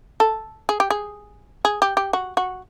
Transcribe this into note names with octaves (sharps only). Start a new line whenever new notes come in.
A4
G#4
G4
G#4
G#4
G4
G4
F#4
F#4